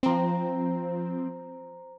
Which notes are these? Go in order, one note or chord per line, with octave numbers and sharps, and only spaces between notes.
F3 C4 C5 A#5